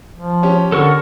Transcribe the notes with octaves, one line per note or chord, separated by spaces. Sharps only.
F3
C#4 G4
D3 A4 A#4 C#6